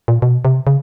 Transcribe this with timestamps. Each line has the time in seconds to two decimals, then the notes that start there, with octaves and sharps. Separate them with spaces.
0.08 A#2
0.22 B2
0.45 C3
0.67 C#3